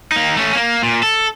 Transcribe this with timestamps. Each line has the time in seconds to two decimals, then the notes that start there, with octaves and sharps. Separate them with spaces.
0.12 A#3 D#4
0.37 A3 C#4
0.55 A#3
0.83 A#2
1.03 A4